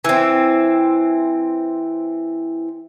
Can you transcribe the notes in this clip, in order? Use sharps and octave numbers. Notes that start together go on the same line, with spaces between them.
E3 C4